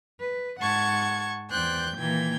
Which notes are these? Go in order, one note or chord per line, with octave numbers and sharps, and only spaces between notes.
B4
G#2 F#5 A5 C#6 G#6
E2 C5 D5 G5 F#6 G6
A#2 D#3 E3 A#3 G5 G#6